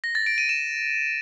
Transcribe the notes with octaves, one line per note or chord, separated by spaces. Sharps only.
A#6
A6
D7
D#7
E7